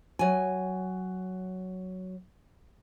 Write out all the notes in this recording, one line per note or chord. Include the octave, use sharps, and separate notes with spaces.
F#3 G#5